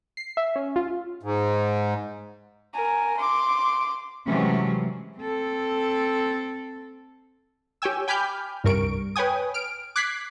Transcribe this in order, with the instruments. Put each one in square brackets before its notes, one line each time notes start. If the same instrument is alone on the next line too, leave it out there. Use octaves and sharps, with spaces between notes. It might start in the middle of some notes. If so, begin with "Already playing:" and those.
[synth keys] C7
E5
C#4
F4
[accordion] G#2
[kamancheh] A#4 G#5
C6 D6
[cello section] C3 E3 F#3 G#3 A3 C#4
[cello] C4 A4
[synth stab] G4 C#5 G5 G#5 E6
G5 G#5 B5 D6 F6 G6
C2 G2 A#4 C#6 D7
B4 C#5 G5 G#5 D#6
F6 D7
D6 F#6 G#6 B6 C7